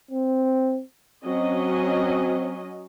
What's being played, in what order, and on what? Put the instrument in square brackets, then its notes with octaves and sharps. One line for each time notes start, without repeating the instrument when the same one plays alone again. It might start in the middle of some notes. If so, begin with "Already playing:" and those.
[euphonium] C4
[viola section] F#3 C#4 D#5 [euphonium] C4